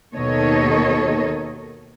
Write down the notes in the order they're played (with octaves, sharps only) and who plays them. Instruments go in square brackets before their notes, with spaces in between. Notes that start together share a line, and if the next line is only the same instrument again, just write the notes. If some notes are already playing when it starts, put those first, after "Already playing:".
[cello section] D#2 B2 D#3 A4 C#5 D#5